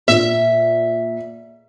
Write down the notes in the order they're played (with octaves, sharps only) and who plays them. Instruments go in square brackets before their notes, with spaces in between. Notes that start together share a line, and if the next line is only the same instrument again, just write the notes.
[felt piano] A#2 [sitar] E5